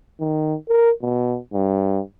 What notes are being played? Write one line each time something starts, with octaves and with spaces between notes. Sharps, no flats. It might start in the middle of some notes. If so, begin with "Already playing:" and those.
D#3
A#4
B2
G2